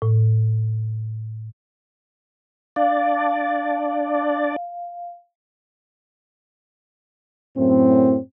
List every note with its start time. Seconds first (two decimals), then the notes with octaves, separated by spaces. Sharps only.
0.02 A2
2.76 D4 D5 F5
7.57 F#2 A2 C4